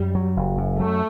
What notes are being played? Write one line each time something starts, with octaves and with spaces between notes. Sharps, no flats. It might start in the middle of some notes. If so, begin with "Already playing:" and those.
Already playing: F#2 G3
F#3
F#1
F#2
F#3 A3